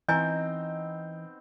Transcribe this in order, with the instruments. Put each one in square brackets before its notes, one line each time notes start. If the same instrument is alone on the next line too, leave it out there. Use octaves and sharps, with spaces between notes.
[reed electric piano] E3 [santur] B3 C4 D#4 [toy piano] D#5 G#5 A#5 [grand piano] G6